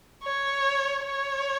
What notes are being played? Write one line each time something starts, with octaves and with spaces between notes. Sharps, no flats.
C#5
C#5